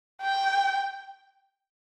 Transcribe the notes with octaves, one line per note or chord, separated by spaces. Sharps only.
G5